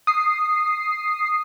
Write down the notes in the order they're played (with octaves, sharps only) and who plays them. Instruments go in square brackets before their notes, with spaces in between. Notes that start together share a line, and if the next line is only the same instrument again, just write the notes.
[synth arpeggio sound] D#6 C7